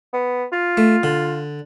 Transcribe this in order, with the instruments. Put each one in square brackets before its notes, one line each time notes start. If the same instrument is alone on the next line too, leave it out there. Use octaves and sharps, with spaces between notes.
[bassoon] B3
F4
[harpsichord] A3
D3